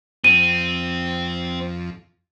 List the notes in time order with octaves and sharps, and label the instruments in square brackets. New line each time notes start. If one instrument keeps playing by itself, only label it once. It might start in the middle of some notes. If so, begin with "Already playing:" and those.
[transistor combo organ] F2 [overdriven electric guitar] C4 [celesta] D#7